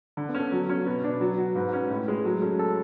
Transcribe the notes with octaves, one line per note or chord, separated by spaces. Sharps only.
D3 D4
B3
C#4
A4
F#3
C#4
B2 B4
D4
F#3
F#4
G#2 B4
C#4
A2
G#3
F#3 A4
C#4 A4
A4